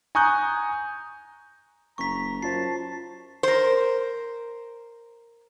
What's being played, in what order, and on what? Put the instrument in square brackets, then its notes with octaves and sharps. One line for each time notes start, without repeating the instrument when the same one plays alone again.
[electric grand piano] G#5 A#5 C#6 D#6 F#6 G6
[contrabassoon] F#1 [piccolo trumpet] A#5 [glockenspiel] C#6 B6
[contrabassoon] F#2 [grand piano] F4 C5 [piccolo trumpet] A5 [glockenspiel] C7
[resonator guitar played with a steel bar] A#4 C5